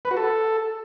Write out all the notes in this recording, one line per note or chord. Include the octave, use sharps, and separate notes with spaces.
B4
F#4
A4